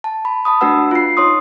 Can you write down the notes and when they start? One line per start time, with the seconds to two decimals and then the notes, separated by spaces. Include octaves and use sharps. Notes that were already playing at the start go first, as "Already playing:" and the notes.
0.04 A5
0.25 B5
0.45 A5 B5 D#6
0.61 A3 D4 F#4 B4 F#5 E6
0.91 F4 C7
1.17 D#4 C#5 C6 D#6